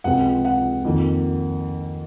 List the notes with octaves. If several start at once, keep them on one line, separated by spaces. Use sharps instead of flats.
C#2 C3 F3 G#3 C4 F#5
F#5
F2 D#3 A#3 F4